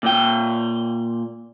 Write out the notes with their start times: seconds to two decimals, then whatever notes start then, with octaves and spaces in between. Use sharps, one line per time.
0.03 A#2 G5